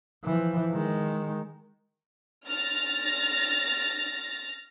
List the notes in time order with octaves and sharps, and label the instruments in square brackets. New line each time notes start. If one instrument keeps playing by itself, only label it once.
[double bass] E3 F3
D#3 G#3
[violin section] F6 A6 A#6